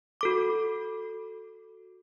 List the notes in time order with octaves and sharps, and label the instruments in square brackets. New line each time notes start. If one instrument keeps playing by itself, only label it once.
[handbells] F#4 A4 D6